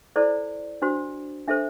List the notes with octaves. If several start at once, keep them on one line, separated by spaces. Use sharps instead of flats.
E4 A4 C5 D5
D4 F#4 C5
D4 A4 C5 E5